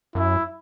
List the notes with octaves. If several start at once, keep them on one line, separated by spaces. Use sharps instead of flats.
F#2 E4